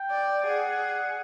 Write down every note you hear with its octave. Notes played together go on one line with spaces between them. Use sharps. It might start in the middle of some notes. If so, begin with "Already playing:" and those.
Already playing: G5
D5
G#4 F#5